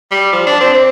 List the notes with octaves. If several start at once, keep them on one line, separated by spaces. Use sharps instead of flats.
G3
F3
D4
C4
C4